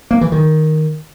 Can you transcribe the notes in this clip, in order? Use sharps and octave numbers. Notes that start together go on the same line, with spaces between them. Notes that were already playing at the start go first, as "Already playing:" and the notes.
A#3
E3
D#3